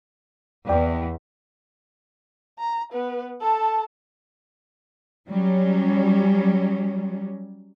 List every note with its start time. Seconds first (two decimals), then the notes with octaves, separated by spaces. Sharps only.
0.69 E2 D5 G5
2.59 A#5
2.93 B3 B4
3.41 A4 A5
5.29 F#3 G3 C#4